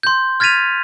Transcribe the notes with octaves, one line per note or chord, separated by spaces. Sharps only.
C6 G6
F6 G#6 A6 B6 D#7 F7